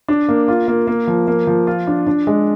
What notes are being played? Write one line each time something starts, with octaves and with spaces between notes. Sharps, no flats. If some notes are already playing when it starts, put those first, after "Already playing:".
D4
A#3
F4
A#3
A#3
F3
A#3
F3
F4
D4
D4
G#3